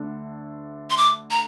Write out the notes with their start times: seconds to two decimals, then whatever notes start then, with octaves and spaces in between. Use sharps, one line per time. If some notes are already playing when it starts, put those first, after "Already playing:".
Already playing: D2 D3 A3 D4 A4
0.90 C6
0.97 D6
1.31 A#5